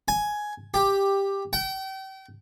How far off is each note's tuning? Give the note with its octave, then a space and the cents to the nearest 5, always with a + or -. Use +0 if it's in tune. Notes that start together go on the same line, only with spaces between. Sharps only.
G#5 +10
G4 +10
G5 -35